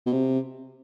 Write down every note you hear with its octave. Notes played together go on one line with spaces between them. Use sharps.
B2
C3